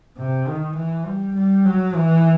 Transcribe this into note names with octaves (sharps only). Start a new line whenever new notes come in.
C3
D#3
E3
G3
G3
F#3
E3